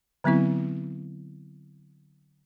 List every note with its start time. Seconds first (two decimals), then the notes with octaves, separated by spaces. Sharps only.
0.24 D3 F#3 B3 C4 E4